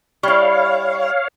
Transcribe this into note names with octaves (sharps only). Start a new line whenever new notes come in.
G3 E4 C#5 F5